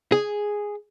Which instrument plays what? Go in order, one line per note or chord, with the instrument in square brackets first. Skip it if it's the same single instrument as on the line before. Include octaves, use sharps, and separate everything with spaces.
[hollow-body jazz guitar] G#4